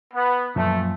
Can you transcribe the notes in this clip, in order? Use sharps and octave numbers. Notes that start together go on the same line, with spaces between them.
B3
F#2 A#2 F3 A3